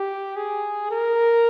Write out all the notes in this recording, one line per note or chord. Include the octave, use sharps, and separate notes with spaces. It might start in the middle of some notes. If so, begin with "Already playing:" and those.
Already playing: G4
G#4
A#4